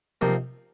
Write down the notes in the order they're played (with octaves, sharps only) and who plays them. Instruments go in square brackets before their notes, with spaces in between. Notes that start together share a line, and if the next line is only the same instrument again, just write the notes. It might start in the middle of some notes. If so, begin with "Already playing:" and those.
[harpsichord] C3 F3 A#3 D#4